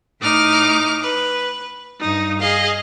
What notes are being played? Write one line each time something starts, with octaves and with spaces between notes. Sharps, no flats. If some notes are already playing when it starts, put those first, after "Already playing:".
A2 D#4 D6 F6
B4
G2 D#4
G#4 D#5 F5